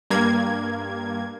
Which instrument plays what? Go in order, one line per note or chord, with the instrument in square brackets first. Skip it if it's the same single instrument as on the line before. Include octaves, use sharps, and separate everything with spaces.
[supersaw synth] G2 A#3 G#6